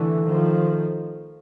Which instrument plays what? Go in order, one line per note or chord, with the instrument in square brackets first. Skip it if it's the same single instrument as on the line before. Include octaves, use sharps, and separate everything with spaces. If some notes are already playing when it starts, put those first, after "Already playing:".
Already playing: [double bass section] D3 E3 [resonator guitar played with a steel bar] A3
[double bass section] D#3 F3